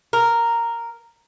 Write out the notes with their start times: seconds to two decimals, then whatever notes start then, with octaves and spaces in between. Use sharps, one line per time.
0.13 A#4